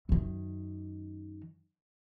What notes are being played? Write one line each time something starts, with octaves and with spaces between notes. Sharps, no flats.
F#2 D#3